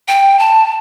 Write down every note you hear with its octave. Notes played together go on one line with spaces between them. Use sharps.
G5
A5